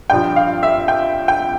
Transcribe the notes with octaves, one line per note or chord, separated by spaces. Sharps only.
G2 F3 G5
F5
E5
G5
G5